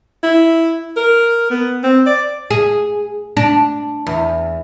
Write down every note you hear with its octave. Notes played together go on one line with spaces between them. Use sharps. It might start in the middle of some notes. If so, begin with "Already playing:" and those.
E4
A#4
B3
C4
D5
G#4
D4
E2